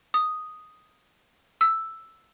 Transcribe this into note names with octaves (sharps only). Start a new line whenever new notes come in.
D#6
E6